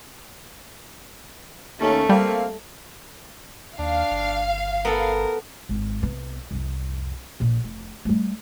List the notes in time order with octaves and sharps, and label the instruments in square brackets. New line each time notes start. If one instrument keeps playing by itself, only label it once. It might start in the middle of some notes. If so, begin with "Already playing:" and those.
[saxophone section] D#2 C#4 [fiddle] A3
[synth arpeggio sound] G3 [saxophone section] A#3 C4 F5
[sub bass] D#2 [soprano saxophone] D4 [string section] F5
[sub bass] G1
[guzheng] B3 A4 [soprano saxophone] A#4
[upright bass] G#1
C2 B3
C2 F2
A#1 A#2
F1
G3 A3